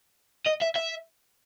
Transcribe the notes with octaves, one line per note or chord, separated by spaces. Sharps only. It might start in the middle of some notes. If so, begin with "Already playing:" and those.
D#5
E5
E5